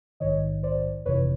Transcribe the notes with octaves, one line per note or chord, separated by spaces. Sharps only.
A#1 G#2 D#3 C#5 D#5
C5 D5
G1 F2 C3 E3 B4 C#5